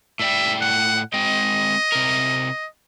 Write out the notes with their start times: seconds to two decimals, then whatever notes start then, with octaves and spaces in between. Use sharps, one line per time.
0.20 A2 D5 E5 G5
0.61 F#5
1.14 G#3 C4 D#5 G5
1.92 C3 A#4